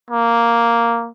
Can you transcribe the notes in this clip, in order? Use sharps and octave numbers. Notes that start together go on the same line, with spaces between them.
A#3